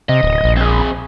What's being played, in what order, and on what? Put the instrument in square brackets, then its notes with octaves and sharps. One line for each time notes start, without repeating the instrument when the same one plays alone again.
[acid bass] C3 [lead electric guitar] D#5
[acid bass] D1
A#1
[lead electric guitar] C4 G#4